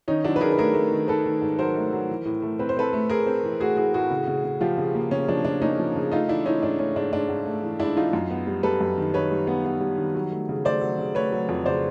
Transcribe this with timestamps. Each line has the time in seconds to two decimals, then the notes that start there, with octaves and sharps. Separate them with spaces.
0.08 D#3 C#4 D#4
0.24 F#3 D4 E4
0.36 B4
0.41 D#3 G#4 A#4
0.52 B4
0.58 A3 G#4 A#4
0.74 A3
0.92 D#3
1.08 D#3 A4 B4
1.26 D#3
1.42 G#2
1.59 F#3 A#4 C5
1.76 A3
1.93 F#3
2.09 E3
2.25 A2
2.42 A3
2.59 C4 B4
2.69 C5
2.77 C4 A4 B4
2.93 A3
3.09 A3 G#4 A#4
3.26 C4
3.43 E3
3.60 A3 F#4 G#4
3.76 E3 F#4 G#4
3.93 A2 F#4 G#4
4.11 C#3
4.27 C#3
4.44 C#3
4.61 F3 F4 G4
4.78 C#3
4.95 A#3
5.11 C#3 C#4
5.29 F3 D4
5.44 F3 D4
5.62 A#3 C#4 D#4
5.79 F3
5.96 C#3
6.12 A3 D#4 F4
6.28 E3 D4 E4
6.45 E3 C#4 D#4
6.62 G#2 D4
6.79 A3 C#4
6.96 G#2 D4
7.13 G#2 D4
7.29 G#2
7.46 A3
7.63 E3
7.79 G#2 D4 E4
7.97 E3 D#4 F4
8.13 F#2
8.31 B3
8.47 G3
8.63 G3 A4 B4
8.81 F#2
8.98 D#3
9.14 D#3 B4 C#5
9.31 G3
9.47 B3
9.65 B3
9.81 G3
9.98 D#3
10.15 F#3
10.32 A3
10.49 C#3
10.65 A3 C5 D5
10.81 F#3
10.98 C#3
11.15 A3 B4 C#5
11.32 F#3
11.49 F2
11.65 C#3 C5 D5